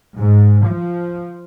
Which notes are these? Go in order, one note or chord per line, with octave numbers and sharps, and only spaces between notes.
G#2
F3